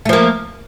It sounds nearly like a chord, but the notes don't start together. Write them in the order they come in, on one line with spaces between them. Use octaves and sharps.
A3 F3 A#3